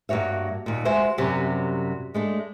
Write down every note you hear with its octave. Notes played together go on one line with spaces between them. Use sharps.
G2 A#3 F#4 C#5 E5
D#2 A#2
G#3 F#4 C5 E5
F#2 C3 F#3 G3
G#3 A3 D4